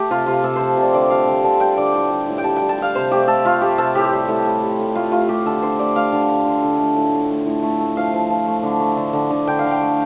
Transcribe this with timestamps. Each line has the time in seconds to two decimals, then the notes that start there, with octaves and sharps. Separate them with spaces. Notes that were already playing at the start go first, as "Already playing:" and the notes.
Already playing: A3 G4
0.11 C3 F4
0.26 C3 F4
0.44 C3 A4
0.56 F3 C5
0.77 C3 D5
0.94 D3 D5
1.10 G3 F5
1.27 D3 G5
1.44 D3 A5
1.60 G3 G5
1.77 D3 D5
1.94 A2 G5
2.11 G3
2.28 A2
2.38 G5
2.44 G3 A5
2.56 G5
2.62 G3
2.69 A5
2.78 G3 F5
2.95 C3 C5
3.11 A3 G4
3.28 A3 A4
3.45 A3 F4
3.61 A3 G4
3.78 C3 A4
3.95 A2 G4
4.12 G3
4.28 A2
4.45 G3
4.62 G3
4.79 A2
4.95 A3 F4
5.12 A3 F4
5.29 A3 G4
5.45 D3 A4
5.62 D3 C5
5.79 A3 D5
5.95 A3 F5
6.13 D3
6.29 D3
6.46 D3
6.63 D3
6.79 A3
6.96 A2
7.13 A3
7.30 A3
7.46 A2
7.63 A3
7.80 A3
7.97 F3 F5
8.13 F3
8.30 F3
8.47 A3
8.63 D3
8.80 A3
8.97 D3
9.13 D3
9.31 D3
9.47 D3 G5
9.59 F5
9.64 D3
9.71 G5
9.81 A3